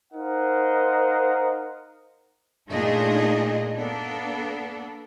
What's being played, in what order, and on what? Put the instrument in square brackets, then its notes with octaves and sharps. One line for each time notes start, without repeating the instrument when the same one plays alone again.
[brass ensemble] D#4 A#4 C5 D#5 F5 F#5
[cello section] A#2 A3 D4 D#4 G#4 D#5
A#3 B3 D4 A4